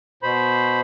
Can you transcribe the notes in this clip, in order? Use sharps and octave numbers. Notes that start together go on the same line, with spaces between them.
B2 C5 B5